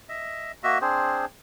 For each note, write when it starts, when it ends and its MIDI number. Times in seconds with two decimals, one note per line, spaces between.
0.09 0.52 75
0.09 0.52 76
0.63 0.79 58
0.63 0.79 66
0.63 0.79 75
0.63 0.79 76
0.81 1.25 60
0.81 1.25 62
0.81 1.25 68
0.81 1.25 72